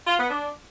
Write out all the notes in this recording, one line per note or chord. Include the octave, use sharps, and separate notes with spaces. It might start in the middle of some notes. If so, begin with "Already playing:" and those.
F4
B3
D4